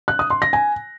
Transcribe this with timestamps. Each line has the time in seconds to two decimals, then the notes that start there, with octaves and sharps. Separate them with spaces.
0.08 F#6
0.19 D#6
0.30 C6
0.42 A#6
0.53 G#5